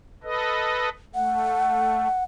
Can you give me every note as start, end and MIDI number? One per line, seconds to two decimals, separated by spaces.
0.24 0.89 69
0.24 0.89 71
0.24 0.89 75
1.15 2.08 57
1.15 2.24 78